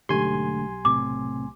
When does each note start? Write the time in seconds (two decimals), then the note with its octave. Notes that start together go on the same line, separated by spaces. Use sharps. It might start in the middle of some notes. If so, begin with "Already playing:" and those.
0.09 B1 G#2 D3 A3 G4 G#5 C6
0.85 A2 C3 D6